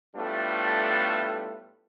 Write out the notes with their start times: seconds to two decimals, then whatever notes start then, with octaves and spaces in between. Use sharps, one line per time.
0.16 A2 G3 A3 B3 D4 F4